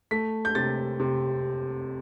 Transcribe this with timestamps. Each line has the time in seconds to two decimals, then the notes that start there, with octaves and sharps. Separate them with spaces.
0.11 A3 B6
0.45 G6
0.55 C3 A6
1.00 C3